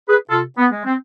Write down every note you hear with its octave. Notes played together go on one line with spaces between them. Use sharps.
G#4 B4
C3 F4 A4
B3
G#3
C4